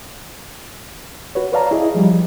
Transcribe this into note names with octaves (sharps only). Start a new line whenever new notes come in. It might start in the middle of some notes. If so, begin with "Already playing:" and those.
F#4 B4 C#5
B4 C#5 D5 F5 A5 A#5
E4 G#4 D#5
F3 G3